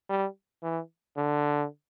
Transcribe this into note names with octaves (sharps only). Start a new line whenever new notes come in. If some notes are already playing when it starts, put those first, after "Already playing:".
G3
E3
D3